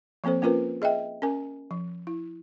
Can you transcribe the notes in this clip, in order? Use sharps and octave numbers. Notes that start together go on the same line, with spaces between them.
F3 A#3 C4 A4 C5
A#3 C#4 F4 A#4 B4
G#4 D#5 E5 G5
C#4 A#4 G#5
F3
E4